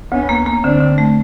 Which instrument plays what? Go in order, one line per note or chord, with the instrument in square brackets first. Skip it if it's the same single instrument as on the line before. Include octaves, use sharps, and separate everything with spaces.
[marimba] D2 [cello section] B3 C#4
[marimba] A#3
A#3
[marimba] D3 [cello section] C4 D4
[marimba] D3
A3